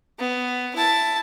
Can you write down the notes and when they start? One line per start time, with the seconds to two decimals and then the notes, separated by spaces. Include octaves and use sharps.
0.19 B3
0.76 E4 A5